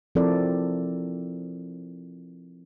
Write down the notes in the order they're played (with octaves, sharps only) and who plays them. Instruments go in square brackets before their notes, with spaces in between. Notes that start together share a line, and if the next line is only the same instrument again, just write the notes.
[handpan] F3 C4 E4 A4 A#4 D5